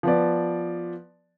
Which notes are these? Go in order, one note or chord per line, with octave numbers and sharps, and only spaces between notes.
F3 B3 D5